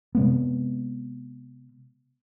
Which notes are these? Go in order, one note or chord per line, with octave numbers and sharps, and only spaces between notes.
C3 G#3 B3